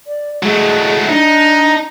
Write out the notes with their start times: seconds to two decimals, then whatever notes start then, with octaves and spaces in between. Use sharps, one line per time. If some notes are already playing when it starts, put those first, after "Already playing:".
0.07 D5
0.43 F#3 G#3 A3
1.09 D4 D#4